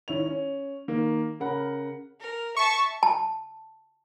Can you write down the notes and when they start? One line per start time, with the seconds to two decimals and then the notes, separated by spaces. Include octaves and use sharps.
0.08 D#3 E4 C#5 F7
0.26 C#4
0.88 D#3 A#3
1.40 C#3 A#4 F#5 B5
2.20 A#4
2.57 E5 A5 C#6
3.03 A5